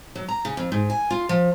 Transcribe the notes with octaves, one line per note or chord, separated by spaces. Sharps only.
F#3
A#5
C#3
F2
G#2
G#5
F4
F3